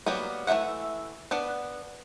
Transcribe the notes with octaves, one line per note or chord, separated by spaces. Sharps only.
F#3 G3 A#3 B3
E3 A3 F4 E5 F#5
B3 D4 B4 F#5